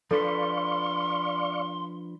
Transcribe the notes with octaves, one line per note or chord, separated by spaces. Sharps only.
F3 D4 A4 B4 D5 F5 C6 C#6